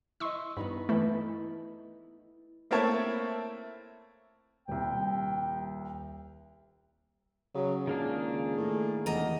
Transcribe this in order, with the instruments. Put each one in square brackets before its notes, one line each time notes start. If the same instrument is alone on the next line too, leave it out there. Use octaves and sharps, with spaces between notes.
[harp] E4 D#5 [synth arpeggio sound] C6 C#6 E6
[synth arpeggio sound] G2 [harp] B3 D#4 B5
[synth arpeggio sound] E3 A3 [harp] E4 A4 B4
[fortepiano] A3 A#3 C4 E4 C#5 A5
[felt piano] D#1 C2 [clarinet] G5
[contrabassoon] C#3 [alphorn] F#3
[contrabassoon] C#2 [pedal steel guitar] D#3 A#3 D4 [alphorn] G#4
[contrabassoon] A2
[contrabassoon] F1 [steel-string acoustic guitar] E2 D#5 A#5